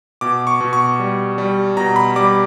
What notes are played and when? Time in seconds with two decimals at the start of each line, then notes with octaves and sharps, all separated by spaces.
0.21 B2 D6
0.47 C#6
0.61 B2
0.73 C#6
0.99 G3
1.38 G3
1.77 B2 A#5
1.96 B5
2.16 G3 D6